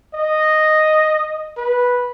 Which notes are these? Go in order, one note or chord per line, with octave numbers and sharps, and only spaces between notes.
D#5
B4